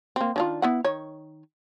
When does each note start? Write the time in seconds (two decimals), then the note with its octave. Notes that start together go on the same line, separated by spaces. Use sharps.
0.16 A#3 C4
0.36 D#3 D4 F4
0.62 B3 E4 F#5
0.84 D#3 C#5